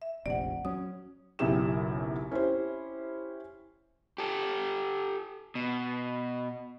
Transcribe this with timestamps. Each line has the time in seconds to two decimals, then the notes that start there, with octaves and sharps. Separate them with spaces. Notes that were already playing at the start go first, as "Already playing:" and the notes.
0.02 E5
0.26 F1 A#1 C3 D5 F#5
0.65 F#3 C#4 D#6
1.39 F#1 B1 F#2 E4 G4 E7
2.31 C#4 E4 G4 C5
4.18 G4 A4
5.55 B2